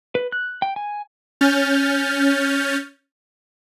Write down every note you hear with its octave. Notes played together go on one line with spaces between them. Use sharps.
B4
F#6
G5
G#5
C#4 F6 G6 A6